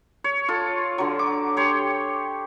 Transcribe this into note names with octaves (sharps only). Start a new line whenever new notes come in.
C#5
F4 A4
D3 F#3
D6
G4 C#5 C6